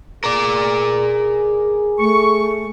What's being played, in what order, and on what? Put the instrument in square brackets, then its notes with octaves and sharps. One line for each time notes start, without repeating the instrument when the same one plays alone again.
[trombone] G#4 [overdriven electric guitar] A#4 D5
[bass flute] A3 [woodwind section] C#6